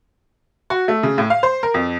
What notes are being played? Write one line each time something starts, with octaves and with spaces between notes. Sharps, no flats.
F#4
A3
C#3
A2
F5
C5
A#4
F2